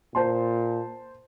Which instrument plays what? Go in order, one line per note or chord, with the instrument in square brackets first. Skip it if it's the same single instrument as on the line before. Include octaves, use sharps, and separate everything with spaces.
[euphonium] A#2 [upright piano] C5 A5 C6